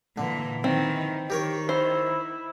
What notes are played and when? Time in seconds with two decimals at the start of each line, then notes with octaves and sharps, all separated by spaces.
0.18 A#2 D3 E3
0.64 D#3 E3 C4
1.30 D#3 G4 A#4 C#5
1.69 E4 C5